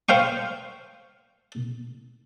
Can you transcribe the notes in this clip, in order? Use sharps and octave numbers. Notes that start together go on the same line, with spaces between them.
C5 F5 G5 C#6